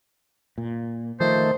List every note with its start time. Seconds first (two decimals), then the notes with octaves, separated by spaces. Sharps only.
0.58 A#2
1.20 D#3 F3 A3 C5